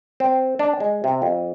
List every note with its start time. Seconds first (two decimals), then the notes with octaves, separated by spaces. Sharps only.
0.20 C4
0.59 D4
0.80 G#3
1.04 C3
1.22 F2